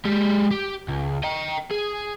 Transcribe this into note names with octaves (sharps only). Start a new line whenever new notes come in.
G#3 G4
G4
C#2
D#5 G5
G#4